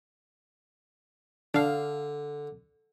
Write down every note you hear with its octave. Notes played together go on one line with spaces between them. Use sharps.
D3 D4 F5